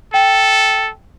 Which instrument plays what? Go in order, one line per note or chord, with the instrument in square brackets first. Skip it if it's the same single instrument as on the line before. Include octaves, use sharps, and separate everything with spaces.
[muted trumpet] A4 [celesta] G5